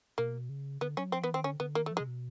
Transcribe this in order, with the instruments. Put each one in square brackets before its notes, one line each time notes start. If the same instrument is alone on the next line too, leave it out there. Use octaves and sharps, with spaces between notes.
[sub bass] B2 [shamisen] A#3
[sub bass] C#3
[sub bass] D3 [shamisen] B3
[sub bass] F#3 [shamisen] C#4
[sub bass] F3 [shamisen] C4
[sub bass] E3 [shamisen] B3
[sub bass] D#3 [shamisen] C4
[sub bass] D3 [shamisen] C#4
[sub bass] D3 [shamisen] B3
[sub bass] D#3 [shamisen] A#3
[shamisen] A3
[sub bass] F3
[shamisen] G#3
[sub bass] C3
B2